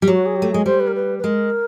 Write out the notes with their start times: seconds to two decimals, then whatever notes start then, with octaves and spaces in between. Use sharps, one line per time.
0.02 G3
0.07 F#3 F#4
0.26 G#4
0.36 G4
0.42 A3
0.52 G#3 G#4
0.66 G3 C5
0.80 B4
0.87 A#4
0.95 B4
1.19 B4
1.24 G#3 A#4